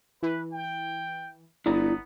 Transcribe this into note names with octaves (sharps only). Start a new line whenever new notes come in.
E3 B4
G5
G1 B3 E4 D5 A#5